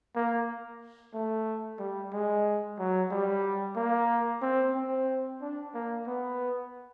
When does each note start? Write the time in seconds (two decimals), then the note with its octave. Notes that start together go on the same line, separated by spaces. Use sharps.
0.16 A#3
1.14 A3
1.79 G3
2.13 G#3
2.79 F#3
3.11 G3
3.76 A#3
4.42 C4
4.75 C4
5.41 D4
5.74 A#3
6.07 B3